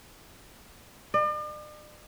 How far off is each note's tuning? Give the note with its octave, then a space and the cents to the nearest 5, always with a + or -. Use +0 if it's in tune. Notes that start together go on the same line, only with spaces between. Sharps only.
D5 +45